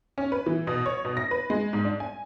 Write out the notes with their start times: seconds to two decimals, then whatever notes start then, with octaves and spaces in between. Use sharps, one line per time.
0.18 C#4
0.32 B4
0.46 E3
0.67 B2
0.86 C#5
1.05 B2
1.17 A#6
1.31 B4
1.50 G#3
1.73 G#2
1.85 D4
2.00 G#5